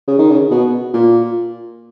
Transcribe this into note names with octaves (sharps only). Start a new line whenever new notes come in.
C#3
D#3
C#3
B2
A#2